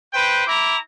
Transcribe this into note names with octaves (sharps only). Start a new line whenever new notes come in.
B4 C5 G5
E4 A#5 D6